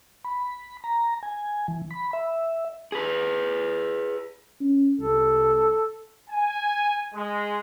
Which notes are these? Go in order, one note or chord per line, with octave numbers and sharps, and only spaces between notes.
B5
A#5
G#5
E3
B5
E5
G#4 B4
C#4
C2 A4
G#5
G#3